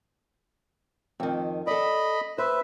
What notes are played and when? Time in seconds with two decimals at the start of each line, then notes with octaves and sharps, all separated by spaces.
1.20 F2 D#3
1.67 A4 D5 D#5 B5
2.38 B4 C5 E5